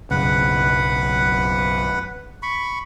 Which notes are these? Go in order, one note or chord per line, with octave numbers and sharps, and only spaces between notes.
B1 F#2 C#3 B4 F#5
B5 C#6